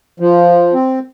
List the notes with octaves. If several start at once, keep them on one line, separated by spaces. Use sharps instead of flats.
F3
C4